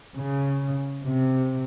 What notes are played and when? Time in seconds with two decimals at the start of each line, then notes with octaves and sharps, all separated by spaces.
0.17 C#3
1.06 C3